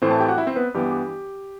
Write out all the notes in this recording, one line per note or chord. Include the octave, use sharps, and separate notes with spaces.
A2 E3 A3 C4 C5
A4 A5
G4 G5
F#4 F#5
E4 E5
C4 C5
B3 B4
G2 E3 B3 G4
G4